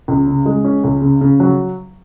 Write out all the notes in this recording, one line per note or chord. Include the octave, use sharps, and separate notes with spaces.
C#2
C#3
G#3
C#4
C#2
C#3
C#3
F#3